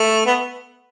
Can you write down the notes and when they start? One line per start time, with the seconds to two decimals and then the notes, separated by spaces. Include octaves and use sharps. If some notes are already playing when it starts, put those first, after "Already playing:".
Already playing: A3
0.26 B3